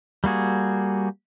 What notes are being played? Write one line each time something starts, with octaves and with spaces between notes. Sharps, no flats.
G3 A#3 F#4 G#4